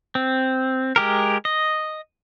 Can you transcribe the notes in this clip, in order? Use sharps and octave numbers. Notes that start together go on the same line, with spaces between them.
C4
G#3 G4 A#4
D#5